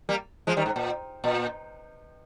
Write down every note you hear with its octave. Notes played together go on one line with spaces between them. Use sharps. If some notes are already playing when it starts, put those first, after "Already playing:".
G3 A#3
F3 G#3
D#3 G3
G#2
A#2
A#2